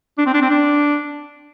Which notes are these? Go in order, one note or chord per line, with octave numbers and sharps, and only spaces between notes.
D4
C4
D4
C4
D4